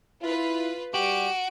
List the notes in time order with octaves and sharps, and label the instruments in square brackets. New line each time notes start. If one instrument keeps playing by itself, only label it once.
[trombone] E4 [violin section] F4 B4
[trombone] G3 [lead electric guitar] F#4 [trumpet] G4 [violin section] D7